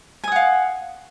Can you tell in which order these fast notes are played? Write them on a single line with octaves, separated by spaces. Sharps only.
G#5 D#6 F#5 F5